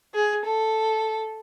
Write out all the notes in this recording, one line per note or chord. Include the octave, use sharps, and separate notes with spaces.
G#4
A4